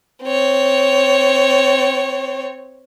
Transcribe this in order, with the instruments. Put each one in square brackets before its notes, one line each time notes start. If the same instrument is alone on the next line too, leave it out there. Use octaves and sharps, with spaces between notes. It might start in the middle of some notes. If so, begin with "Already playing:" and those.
[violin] C4 C#5